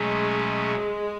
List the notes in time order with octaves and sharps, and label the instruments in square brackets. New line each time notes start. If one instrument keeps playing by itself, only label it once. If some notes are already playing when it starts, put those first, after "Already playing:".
Already playing: [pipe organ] B2 F#3 A3 C#4 [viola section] G#3